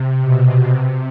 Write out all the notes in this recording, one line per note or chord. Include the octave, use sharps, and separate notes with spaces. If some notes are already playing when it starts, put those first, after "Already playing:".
Already playing: C3
B2
C3